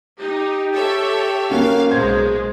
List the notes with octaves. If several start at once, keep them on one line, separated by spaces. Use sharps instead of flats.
D#4 G4
A4 C#5 E5
A#3 C#4 F#4 F5
B1 G#3 C5 G#6